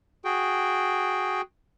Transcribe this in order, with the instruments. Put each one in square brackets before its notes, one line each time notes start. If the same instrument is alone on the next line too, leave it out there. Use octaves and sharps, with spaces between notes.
[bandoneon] F#4 G#4 G5